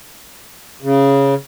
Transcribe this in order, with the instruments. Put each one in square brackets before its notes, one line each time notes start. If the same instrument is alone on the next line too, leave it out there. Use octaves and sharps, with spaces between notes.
[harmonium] C#3